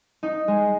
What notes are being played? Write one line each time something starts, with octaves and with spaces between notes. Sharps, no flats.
D#4
G#3